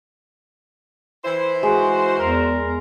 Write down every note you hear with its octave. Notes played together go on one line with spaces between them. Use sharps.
E3 E4 C5
G#3 F#4
E2 A#4